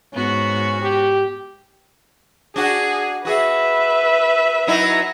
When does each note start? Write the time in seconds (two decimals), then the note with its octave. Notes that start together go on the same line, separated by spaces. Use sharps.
0.13 G#2 B3 C#4 F#4
0.82 G4
2.56 D4 F#4 G#4
3.25 F#4 G#4 B4 E5
4.67 F#3 D#4 E4